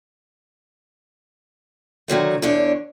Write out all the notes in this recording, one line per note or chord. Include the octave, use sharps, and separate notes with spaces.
D3 D#3 F#3 A3
E2 D3 D4 C#5